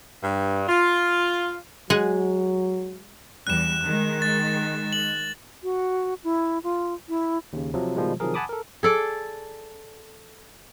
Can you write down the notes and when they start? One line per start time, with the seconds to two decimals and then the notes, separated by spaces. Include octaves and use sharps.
0.23 G2
0.68 F4
1.90 F#3 G#3 F#5 G#5
3.47 E2 G3 F#6 E7
3.84 D#3 G#3
4.22 A6
4.93 F#7
5.63 F#4
6.24 E4
6.64 F4
7.09 E4
7.53 D#2 C#3
7.74 C3 F3 F#3
7.96 B2 D#3 F3 G3 G#3
8.20 C3 D#3 F3 F#3 G#4 A#4
8.34 F#5 G#5 A5 B5 D6 D#6
8.49 A4 A#4
8.83 G#4 A4 D5